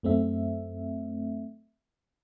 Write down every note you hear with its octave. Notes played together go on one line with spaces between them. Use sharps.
F#2 A3 C4 E5